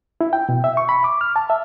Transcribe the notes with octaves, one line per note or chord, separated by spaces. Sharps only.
E4
G5
B2
E5
C#6
B5
D6
F6
A5
E5